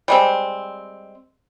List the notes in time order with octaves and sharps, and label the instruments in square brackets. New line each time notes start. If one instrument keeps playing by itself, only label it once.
[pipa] G3 G#3 C4